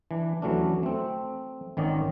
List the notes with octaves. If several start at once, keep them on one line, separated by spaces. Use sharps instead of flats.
E3 D4
D#2 E3 F#3 A3 C#4 D4
A3 C4
G#1 D#3 C#4 D5 D#5